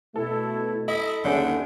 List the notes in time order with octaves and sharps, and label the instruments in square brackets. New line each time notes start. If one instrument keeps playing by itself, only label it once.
[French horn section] B2 A3 [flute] E4 [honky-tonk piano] A4
[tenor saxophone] E4 [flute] A4 [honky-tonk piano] D#5
[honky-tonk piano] G1 C#4 G#4 [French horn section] D#2 [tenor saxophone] D3